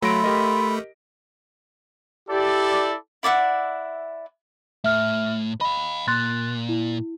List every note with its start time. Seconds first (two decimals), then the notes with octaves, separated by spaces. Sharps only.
0.03 F#3 A3 F4 E5 B5 A#6 D7
0.24 G4 A#4 D#5
2.29 E4 G4 A4 D5
3.23 E4 D5 E5 F#5
4.84 A2 E5 F6
5.61 D#5 F5 B5
6.08 A#2 C6 F#6 A6
6.69 E4